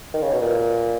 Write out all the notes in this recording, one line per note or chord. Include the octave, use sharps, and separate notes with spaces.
D#3
C#3
B2
A#2